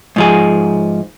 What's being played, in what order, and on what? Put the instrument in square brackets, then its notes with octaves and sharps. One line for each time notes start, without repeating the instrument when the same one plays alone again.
[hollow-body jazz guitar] G#2 F3 G#4